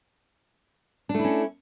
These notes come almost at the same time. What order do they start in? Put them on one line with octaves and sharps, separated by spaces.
D4 A3 E4 C#4